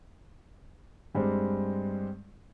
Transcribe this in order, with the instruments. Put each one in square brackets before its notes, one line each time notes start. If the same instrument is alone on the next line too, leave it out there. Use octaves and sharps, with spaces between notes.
[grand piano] G2 G3 G#3 C4